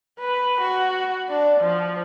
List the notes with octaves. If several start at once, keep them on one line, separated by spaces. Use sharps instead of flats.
B4
F#4
D4
F3